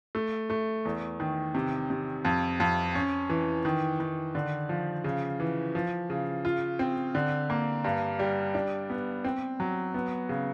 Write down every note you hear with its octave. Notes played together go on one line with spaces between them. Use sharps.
A3
A3
E2
D#3
C3
C3
F2
F2
C#4
E3
D#3
D#3
D3
F3
C#3
E3
F3
C#3
F4
C4
D3
A#3
G2
G3
D4
B3
C4
F#3
B3
C#3